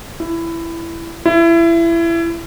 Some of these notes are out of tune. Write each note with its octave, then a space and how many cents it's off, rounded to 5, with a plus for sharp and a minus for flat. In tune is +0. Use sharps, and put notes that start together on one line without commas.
E4 +15
E4 +25